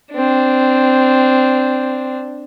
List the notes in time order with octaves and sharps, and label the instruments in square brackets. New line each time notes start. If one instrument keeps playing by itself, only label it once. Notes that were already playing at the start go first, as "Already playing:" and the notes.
[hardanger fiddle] C4 D4